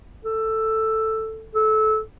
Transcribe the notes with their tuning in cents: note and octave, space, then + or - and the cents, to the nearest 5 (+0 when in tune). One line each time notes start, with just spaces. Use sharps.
A4 +5
A4 -20